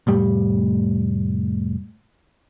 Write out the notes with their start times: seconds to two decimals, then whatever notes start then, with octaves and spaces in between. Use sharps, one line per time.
0.07 F1 A2 G3